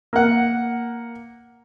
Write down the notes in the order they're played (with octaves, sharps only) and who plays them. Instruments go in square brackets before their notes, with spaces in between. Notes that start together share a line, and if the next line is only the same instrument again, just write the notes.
[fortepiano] A#3 F#5